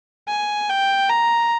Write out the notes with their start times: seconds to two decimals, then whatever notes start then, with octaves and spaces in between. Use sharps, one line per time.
0.28 G#5
0.69 G5
1.09 A#5